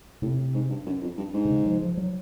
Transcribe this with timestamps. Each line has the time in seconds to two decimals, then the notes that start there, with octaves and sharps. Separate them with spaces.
0.22 A2 C3
0.54 G#2
0.70 G2
0.86 F#2
1.01 F2
1.18 G2
1.34 G#2
1.45 C3
1.50 C#3
1.66 F3
1.82 F3
1.97 F#3